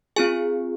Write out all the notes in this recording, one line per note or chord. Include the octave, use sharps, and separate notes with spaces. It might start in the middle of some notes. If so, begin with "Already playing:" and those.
C4 F4 G#4 G#5